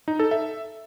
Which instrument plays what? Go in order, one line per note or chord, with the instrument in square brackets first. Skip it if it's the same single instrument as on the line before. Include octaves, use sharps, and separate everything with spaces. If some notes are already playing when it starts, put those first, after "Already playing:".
[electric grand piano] D#4
A4
E5